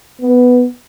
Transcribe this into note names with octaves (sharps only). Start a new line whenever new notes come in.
B3